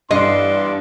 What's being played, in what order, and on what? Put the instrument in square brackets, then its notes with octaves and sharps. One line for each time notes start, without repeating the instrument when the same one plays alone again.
[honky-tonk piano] G2 [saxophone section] E3 B3 D4 [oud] D#5 [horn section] C6